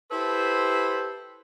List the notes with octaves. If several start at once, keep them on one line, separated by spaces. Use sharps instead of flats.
E4 G4 A4 B4 C5